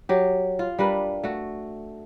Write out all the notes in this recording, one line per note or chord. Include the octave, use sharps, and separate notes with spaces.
F#3 G4
F4
G3 D4 A#4 B4
A3 F#4